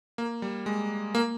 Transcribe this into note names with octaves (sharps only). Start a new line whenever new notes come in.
A#3
G3
G#3
A#3